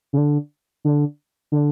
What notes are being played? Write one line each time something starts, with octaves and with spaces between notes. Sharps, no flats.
C#3
D3
D3
D3